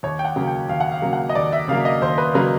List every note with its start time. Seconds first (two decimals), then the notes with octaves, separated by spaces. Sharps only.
0.03 D#2 C#5
0.19 G5
0.25 F#5
0.36 C#3 F#3 A#3
0.47 G5
0.69 D#2 F5
0.80 F#5
0.92 F5
1.02 C#3 F#3 A#3
1.13 F#5
1.29 D#5
1.35 D#2 D5
1.53 E5
1.68 C#3 F#3 A#3 F5
1.85 D#5
2.01 D#2 C5
2.18 B4
2.34 C#3 F#3 A#3 B4